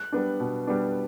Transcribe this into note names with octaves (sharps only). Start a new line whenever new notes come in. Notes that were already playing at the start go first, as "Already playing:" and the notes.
Already playing: F#6
G3 B3 D4
B2
G3 B3 D4